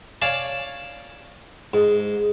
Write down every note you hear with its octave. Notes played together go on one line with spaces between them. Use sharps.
C#5 D5 F5 G#5 A5
G#2